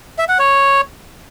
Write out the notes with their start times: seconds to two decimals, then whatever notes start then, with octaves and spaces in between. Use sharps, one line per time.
0.18 E5
0.29 F#5
0.39 C#5